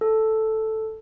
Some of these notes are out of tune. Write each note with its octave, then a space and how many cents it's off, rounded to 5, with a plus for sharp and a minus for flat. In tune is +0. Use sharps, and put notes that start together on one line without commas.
A4 +0